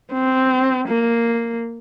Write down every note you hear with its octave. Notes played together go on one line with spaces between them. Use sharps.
C4
A#3